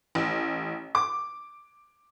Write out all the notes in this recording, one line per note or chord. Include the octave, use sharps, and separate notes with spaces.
A1
D6